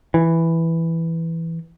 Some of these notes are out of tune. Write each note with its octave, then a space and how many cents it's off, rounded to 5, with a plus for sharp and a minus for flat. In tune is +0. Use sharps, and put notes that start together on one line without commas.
E3 +0